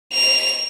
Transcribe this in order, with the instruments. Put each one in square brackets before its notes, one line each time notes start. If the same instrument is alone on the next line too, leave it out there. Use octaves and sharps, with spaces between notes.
[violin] F7